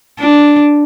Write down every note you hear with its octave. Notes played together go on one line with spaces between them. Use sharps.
D4